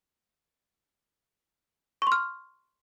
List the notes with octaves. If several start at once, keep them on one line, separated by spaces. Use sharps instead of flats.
C6 C#6 F6